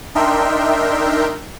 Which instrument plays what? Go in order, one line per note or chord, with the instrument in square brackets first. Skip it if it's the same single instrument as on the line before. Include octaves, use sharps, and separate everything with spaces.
[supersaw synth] D4 D#4 A#4 E5 G5 C6